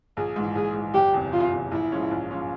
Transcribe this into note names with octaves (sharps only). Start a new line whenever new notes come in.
A#1 G#4
G#2 E3
A#1 G#4
G#2 E3
F#1 G4
E2 C3
F#1 F4
E2 C3
A#1 E4
G#2 F3 G#3 C#4
A#1
F3 G#3 C#4